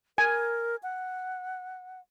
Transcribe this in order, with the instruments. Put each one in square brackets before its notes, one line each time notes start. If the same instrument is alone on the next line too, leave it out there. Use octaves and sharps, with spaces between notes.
[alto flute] A#4 [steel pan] G#5
[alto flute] F#5